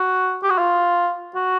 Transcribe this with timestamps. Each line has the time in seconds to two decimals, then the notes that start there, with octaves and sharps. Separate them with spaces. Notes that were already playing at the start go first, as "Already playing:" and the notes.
Already playing: F#4
0.43 G4
0.50 F#4
0.58 F4
1.35 F#4